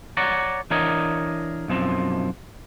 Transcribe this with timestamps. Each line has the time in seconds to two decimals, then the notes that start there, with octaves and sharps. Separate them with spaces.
0.17 C#5 D5 F#5 A#5
0.71 E3 D4 A#4 C#5 D#5
1.68 B1 F#2 F3 C4